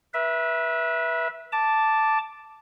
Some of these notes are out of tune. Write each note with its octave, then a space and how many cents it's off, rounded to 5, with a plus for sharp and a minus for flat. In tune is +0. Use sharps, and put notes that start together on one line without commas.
B4 -30 E5 +0
A5 +0 D6 +0